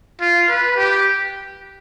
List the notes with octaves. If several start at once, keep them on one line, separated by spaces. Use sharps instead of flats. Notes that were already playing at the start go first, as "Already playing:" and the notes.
F4
B4
G4